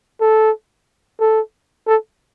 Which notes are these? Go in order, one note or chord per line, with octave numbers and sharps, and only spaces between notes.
A4
A4
A4